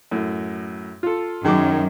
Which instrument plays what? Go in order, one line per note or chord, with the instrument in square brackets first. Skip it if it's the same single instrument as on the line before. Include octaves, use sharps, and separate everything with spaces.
[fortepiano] F#2 A2
F4 A4
[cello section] F#2 [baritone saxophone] D#3 [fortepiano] G#4 D6